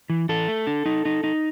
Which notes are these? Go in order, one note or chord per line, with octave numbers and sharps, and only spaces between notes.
E3
E3 A4
A3
D4
D#4
D#4
D#4